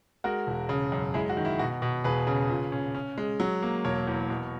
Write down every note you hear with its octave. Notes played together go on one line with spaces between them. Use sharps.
G#3 F#4 A#4
E1
C#3
F#2
G#3 E4 G#4
F#4
D#3
E4
B2 F#4
B2
E1 G#4 B4
C#3
A#2
C#4
C#4
G#3
F#3
A#3
E1 A#4 C#5
E2
B2